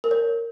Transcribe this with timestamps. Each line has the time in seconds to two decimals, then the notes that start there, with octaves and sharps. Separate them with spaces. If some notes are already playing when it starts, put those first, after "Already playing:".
0.04 A#4
0.11 C#5